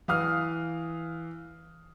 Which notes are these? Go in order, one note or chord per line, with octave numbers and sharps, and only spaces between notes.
E3 F5 D#6 F6